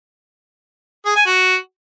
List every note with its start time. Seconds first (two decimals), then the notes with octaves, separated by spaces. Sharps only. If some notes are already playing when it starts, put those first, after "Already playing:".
1.06 G#4
1.16 G#5
1.26 F#4